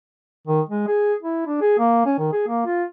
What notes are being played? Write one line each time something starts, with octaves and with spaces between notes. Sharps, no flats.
D#3
G#3
G#4
E4
D4
G#4
A#3
C#4
D#3
G#4
A#3
F4